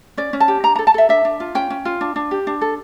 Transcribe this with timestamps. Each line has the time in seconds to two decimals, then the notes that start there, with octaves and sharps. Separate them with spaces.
0.17 C#4 D5
0.33 C#4
0.40 A5
0.48 G4
0.63 D4 A#5
0.76 A#5
0.79 A4
0.87 A5
0.94 A4 E5
1.09 D4 E5
1.25 D4
1.40 F4
1.55 C#4 G5
1.70 C#4
1.85 F4
2.01 D4
2.16 D4
2.31 G4
2.47 D4
2.61 A4